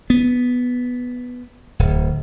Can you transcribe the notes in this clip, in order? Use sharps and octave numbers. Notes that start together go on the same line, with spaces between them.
B3
D1